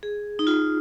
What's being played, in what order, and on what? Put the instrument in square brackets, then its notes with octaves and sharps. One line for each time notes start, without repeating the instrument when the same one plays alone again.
[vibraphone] G#4
D#4
F4